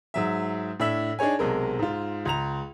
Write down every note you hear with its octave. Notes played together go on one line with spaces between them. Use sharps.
G#2 F#3 E5
A2 D4 E5 E6 F#7
D4 D#4 G#4 C#5 G#5
B1 C3 G#3 A#4
G#2 F4
C#2 A#5 F7